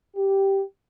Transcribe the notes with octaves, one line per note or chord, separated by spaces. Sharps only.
G4